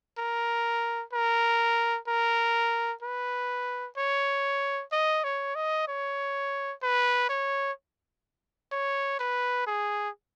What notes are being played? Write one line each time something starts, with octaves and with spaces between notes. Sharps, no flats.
A#4
A#4
A#4
B4
C#5
D#5
C#5
D#5
C#5
B4
C#5
C#5
B4
G#4